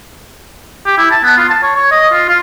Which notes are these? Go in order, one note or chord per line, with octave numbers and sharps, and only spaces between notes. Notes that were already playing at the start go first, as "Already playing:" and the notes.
G4
E4
A5
B3
F4
A5
C#5
C#5
D#5
F4
F4